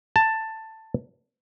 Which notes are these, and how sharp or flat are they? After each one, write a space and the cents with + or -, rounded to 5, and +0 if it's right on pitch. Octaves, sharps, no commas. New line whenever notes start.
A5 +10